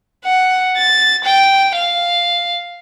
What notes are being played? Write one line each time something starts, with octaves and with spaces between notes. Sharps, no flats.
F#5
A6
G5
F5